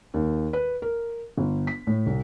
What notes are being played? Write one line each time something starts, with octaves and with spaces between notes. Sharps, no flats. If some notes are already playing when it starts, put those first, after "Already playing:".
D#2
B4
A#4
G1
B6
A2
C2